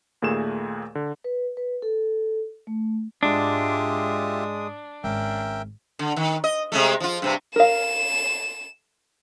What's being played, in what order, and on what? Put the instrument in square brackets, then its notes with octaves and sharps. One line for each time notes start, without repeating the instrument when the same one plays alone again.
[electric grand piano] D#2 A#2 A3 G#4 E7
D3
[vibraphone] B4
B4
A4
A3
[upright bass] G#2 [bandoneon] G#3 D#6 [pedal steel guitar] D4 [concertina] F4 G4 E5
[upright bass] G#1 [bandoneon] C#4 [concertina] A#4 E5 G5
[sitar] D3
D#3
D#5
C3 G#3 A3
F3 F4
G2 C3 C4
[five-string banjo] A#4 F5 [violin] E7